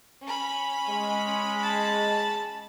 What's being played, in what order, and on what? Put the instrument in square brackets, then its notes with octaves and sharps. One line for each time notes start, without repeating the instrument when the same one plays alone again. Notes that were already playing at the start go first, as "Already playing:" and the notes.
[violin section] C#4 B5
[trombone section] G#3
[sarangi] A5